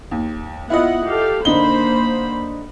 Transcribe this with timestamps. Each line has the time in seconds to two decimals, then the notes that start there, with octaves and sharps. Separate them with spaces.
0.11 D#2
0.70 B3 E4 F4 D#5 F#5
1.07 G4 A4 F5
1.45 D3 A#3 D#4 C5 B5 G7